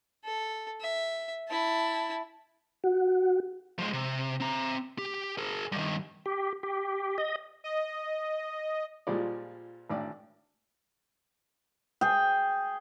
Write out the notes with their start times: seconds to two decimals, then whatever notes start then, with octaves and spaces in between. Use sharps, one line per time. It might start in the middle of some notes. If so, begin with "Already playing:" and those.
0.24 A4
0.80 E5
1.48 E4 A5
2.84 F#4
3.79 F3 G#3
3.93 C3
4.40 C4 A#5
4.98 G4
5.38 G#4 A#4
5.72 G2 D#3
6.26 G4
6.63 G4
7.18 D#5
7.64 D#5
9.07 A#2 F3 G3 G#3 D5
9.89 G#1 A2 D4 D5
12.01 G#4 G5